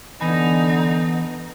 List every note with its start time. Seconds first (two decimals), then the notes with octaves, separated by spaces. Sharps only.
0.21 D3 E3 B3 D#4 G#5 B5